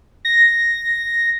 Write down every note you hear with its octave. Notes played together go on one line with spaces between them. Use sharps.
A#6